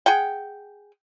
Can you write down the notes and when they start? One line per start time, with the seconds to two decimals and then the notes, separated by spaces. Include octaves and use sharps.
0.06 G#4 F#5 G5